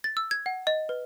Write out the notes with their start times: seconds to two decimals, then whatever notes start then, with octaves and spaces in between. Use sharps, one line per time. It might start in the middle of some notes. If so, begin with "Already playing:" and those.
0.04 A6
0.17 E6
0.31 G#6
0.46 F#5
0.67 D#5
0.89 B4